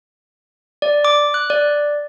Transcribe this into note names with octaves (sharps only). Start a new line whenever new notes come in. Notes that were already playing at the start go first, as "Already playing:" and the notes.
D5
D6
F#6
D5